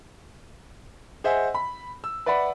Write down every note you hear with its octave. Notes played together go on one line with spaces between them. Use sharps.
G#4 C5 D#5 E5 F#5 G#5
B5
E6
B4 D5 E5 F#5 B5